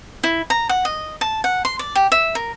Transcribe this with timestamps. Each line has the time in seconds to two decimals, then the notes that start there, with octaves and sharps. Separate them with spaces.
0.23 E4
0.50 A#5
0.69 F#5
0.85 D#5
1.21 A5
1.44 F#5
1.65 C6
1.79 D5
1.95 G4
2.12 E5
2.35 A#4